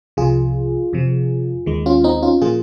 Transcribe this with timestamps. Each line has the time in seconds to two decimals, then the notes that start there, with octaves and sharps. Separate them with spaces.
0.17 C2 C3 F3 F4 G#4
0.93 F2 C3 F3
1.66 D#2 D#3 G#3
1.86 C#4 F4
2.04 C4 D#4
2.23 C#4 F4
2.41 A#2 F3 A#3 F4 G#4